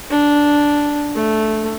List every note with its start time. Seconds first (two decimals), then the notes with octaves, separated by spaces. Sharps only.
0.10 D4
1.15 A3